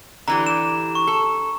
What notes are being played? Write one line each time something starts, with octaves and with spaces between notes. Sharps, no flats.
D3 E3 G4 A#5
E7
C#6
A4